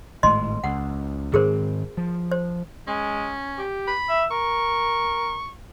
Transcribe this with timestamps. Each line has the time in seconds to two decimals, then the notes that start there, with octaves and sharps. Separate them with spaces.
0.23 G#1 A2 G#3 D#5 C6
0.64 C#2 F#5
1.34 G#2 D#3 C4 G#4 A#4 C5
1.97 F3
2.31 C5
2.87 G#3 C#4
3.58 G4
3.88 B5
4.09 E5
4.31 A#4 C#6